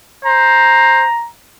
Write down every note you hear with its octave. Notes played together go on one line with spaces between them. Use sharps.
C5 A#5